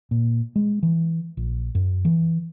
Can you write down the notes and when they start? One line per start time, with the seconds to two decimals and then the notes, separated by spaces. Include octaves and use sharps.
0.11 A#2
0.56 G#3
0.83 E3
1.37 A#1
1.75 F#2
2.05 E3